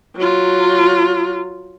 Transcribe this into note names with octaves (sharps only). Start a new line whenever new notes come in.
F#3 F4